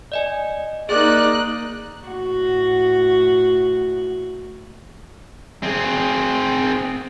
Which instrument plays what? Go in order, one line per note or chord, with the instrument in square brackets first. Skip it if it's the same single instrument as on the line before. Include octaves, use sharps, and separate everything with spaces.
[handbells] D5 D#5 G#5
[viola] A#3 D#4 [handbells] G#4 [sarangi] D5 [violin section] F#6
[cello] A2 F#4
[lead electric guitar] C4 G#4